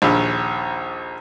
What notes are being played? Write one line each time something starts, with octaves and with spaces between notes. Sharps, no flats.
A#1 D#2 B5